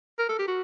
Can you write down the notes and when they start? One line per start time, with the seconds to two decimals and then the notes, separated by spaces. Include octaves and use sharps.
0.18 A#4
0.29 A4
0.39 G4
0.48 F#4